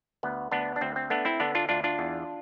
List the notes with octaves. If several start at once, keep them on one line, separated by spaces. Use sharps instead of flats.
D2 B3
D2 B3 D4
D4
D2 C4
C4
A3 B3 D4
C4 E4
D3 B3 D4
D4 F4
D2 D4 F4
D4 F4
E2